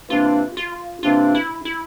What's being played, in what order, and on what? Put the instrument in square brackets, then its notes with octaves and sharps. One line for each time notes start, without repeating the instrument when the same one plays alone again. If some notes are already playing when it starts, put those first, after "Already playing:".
[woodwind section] C3 E3 A#3 D4 [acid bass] F4
[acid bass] F4
[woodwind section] C3 E3 A#3 D4 [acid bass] F4
[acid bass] E4
E4